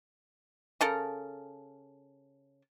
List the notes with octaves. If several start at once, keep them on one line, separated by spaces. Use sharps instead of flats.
C#3 A4 A#4